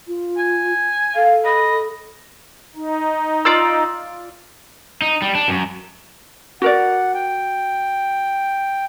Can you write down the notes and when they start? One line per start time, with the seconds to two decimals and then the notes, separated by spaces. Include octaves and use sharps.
0.07 F4
0.38 G#5
1.15 A4 F5
1.45 D#5 B5
2.76 D#4
3.45 F4 D5 E6
5.02 D#4
5.22 G3
5.35 D4
5.48 F#2
6.62 F#4 A#4 D5 F#5
7.14 G5